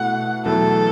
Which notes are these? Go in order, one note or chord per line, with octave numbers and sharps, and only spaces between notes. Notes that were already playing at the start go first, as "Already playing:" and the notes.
Already playing: B2 A3 E4 F#5
E2 B2 F#3 A3 E4 A4